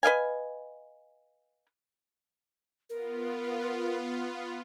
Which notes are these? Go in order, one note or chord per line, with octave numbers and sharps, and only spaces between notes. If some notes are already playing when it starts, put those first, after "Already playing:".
B4 D#5 F5 G#5
B3 F4 A#4